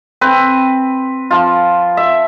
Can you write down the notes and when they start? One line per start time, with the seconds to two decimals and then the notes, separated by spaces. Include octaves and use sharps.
0.21 C4 B4
1.31 F3 F4
1.97 E5